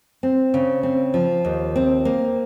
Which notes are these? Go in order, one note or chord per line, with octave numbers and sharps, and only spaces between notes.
C4
C#3
C4
F3
D#2
C4
A#3